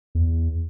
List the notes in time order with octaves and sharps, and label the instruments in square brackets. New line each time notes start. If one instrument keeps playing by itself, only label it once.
[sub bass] E2